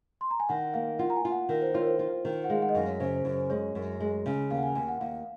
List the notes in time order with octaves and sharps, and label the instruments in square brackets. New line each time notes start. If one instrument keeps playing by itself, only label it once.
[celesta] C6
A#5
G#5
[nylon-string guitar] D#3 [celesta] F#5
[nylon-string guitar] A#3 [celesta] F5
[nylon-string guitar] F4 [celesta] F#5
[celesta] A#5
G#5
[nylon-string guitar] F4
[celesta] F#5
[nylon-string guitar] D#3 [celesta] A#4
[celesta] C5
[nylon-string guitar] F4 [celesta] C#5
[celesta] A#4
C5
[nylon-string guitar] F4
D#3
[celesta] F#5
[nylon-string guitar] G#3 [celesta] F5
[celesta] F#5
D#5
[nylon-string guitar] F#2 [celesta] F5
[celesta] C#5
[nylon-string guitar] C#3 [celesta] C5
[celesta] C5
[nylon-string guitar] F#2
[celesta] C5
[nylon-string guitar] G#3 [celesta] C#5
[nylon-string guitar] F#2
G#3
C#3
[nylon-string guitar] D#2 [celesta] F5
[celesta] F#5
G#5
[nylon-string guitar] D#2 [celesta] G#5
[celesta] F#5
[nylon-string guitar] D#2 [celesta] F5